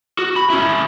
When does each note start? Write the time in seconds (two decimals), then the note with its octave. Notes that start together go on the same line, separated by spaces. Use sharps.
0.19 F#4
0.36 B5
0.50 C#4 E4